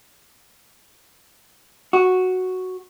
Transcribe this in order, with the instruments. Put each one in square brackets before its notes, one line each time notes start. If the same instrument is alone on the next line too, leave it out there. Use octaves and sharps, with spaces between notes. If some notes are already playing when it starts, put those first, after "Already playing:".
[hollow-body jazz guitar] F#4